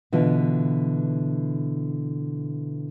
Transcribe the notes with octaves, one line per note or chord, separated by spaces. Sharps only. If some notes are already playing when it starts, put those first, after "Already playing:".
B2 D3 E3 F4